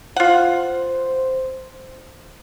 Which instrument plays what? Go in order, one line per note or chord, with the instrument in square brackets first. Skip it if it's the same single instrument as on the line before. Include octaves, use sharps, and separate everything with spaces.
[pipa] F4 F#5 [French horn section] C5